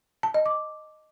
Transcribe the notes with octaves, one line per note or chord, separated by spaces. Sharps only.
A5
D#5
D6